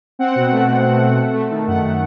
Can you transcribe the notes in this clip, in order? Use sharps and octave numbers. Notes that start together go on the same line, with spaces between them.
C4 F#5
B2
A3
B2
A3
A3
A3
A3
D#3
F#2 F#5
A3